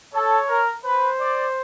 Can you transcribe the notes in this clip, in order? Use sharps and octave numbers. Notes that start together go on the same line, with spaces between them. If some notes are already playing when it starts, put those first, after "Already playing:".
A4 C#5
A#4
B4 C5
D5